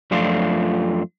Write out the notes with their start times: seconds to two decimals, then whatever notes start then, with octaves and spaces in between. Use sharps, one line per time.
0.11 F#2 F3 A3 D4 F4